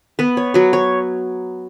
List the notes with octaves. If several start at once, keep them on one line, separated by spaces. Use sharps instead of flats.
B3 B4
C#5
F#3 B4
C#5